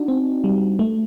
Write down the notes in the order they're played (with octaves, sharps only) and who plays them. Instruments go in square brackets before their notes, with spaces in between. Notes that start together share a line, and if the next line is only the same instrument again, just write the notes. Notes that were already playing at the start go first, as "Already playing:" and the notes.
Already playing: [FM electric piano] D4 D#4 F#4
C4
G3
A3